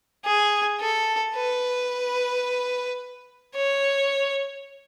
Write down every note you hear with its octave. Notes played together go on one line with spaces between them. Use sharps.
G#4
A4
B4
C#5